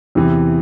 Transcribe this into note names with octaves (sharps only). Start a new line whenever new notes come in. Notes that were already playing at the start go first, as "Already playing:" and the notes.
E2 C3 E3